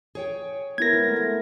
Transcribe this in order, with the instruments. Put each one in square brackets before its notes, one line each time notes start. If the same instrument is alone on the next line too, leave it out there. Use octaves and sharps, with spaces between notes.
[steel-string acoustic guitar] G#4 C#5 G5
[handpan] B3 E4 A#4 [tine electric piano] G#6 A#6
[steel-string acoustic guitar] G#3
[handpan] A3